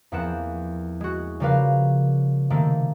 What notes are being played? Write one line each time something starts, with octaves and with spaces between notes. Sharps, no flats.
E2 F3 A#3 C4 F#5 E7
G#3 F#4
C#3 F3 G3 A#4 B4 F5
C3 D#3 A3 A#3